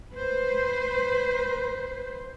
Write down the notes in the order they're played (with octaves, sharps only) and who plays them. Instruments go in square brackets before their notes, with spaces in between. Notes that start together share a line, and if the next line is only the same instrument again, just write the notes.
[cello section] B4 C5